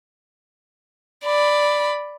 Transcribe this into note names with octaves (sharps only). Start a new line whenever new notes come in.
D5 B5